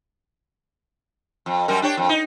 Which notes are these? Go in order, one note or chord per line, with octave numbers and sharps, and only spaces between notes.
F2
F#2 G3 A#4
D4 G4 C#5
F2
D#4